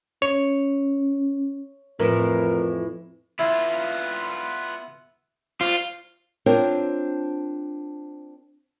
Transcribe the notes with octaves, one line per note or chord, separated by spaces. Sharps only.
C#4 C#5
F2 A2 E3 A#4
B3 E4 F4
F4 C5 D5
C4 D4 F4 A#4 C5 C#5